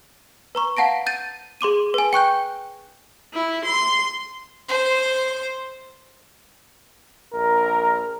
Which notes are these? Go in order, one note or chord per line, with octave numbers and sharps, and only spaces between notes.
B4 A#5 C#6
F5 F#5 A5 A#6 D7
G6 A6 D#7
G#4 C6 D6 D#7
B4 G#5
G5 C#6 F#6 G6
E4
C6
C5
A#1 A#4